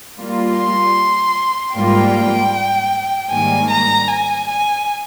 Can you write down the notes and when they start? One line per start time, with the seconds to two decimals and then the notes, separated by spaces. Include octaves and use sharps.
0.18 G3 A#3 F4
0.58 C6
1.74 G#2 G3 A#3 F4 G5
3.30 G#2 D#3 G3 A#3 G#5
3.70 A#5
4.08 G#5
4.48 G#5